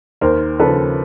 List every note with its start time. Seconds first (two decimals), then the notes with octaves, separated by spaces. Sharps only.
0.21 D#2 A#4 C5
0.59 C#3 F3 A4 B4